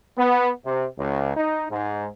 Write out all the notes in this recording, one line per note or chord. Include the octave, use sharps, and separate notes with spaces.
B3
C3
C#2
D#4
G#2